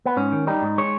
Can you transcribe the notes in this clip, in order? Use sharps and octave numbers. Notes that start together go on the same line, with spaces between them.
B3
G#2 C#4
D#3
G3 D#4
G#2
G#3 C#5